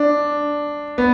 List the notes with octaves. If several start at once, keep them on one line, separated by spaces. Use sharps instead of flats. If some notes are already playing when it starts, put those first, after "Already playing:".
Already playing: D4
B3